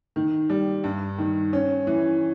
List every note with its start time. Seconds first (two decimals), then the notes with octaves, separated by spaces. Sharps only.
0.16 D#3
0.50 G3
0.84 G2
1.18 D#3
1.53 C#4
1.87 E3